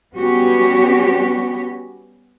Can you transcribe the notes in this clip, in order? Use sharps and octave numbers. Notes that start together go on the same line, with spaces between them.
G3 B3 C#4 F#4 G4